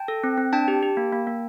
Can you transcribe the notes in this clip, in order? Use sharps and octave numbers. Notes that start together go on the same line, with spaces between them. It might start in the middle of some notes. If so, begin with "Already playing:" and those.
Already playing: G5 A5
A4
C4
C4
D4 G5 A5
G4
G4
A#3
A#3
A#3